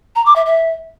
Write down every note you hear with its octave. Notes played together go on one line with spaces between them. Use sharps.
A#5
D6
E5
E5